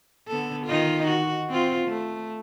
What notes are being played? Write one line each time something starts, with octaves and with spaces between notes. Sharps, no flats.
D3 B3 A4
D#3 D#4 F4
F#4
C4 F4
A3